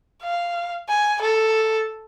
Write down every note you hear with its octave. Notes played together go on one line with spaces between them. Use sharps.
F5
G#5
A4